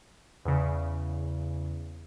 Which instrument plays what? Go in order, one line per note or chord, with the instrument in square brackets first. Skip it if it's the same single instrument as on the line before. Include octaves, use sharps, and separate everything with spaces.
[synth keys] E2 C#3